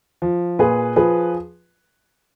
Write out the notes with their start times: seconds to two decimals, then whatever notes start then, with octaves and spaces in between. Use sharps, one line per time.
0.22 F3
0.59 A#2 G#4 B4
0.96 F3 G#4 B4